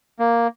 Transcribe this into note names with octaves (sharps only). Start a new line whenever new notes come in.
A#3